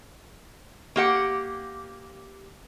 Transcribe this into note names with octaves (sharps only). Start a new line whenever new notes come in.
A#3 G4 F#5